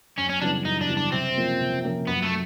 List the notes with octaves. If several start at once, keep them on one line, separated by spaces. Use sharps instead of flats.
F#2 C#4
C#4
C#3 E3 G3 B3 D4
F#2 D#4
D4
C#3 E3 G3 B3
D4
C3 C4
F3 A#3 C#4 F4
C3
F3 A#3 C#4 F4
F#2 B3
A3